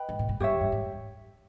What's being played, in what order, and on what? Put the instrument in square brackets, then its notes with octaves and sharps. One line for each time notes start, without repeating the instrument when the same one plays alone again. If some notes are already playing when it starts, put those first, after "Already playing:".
Already playing: [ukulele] B4 D#5 G5 B5
[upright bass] G#2
A#2
G#2
[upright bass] G2 [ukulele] G4 C#5 E5
[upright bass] E2
G2
G#2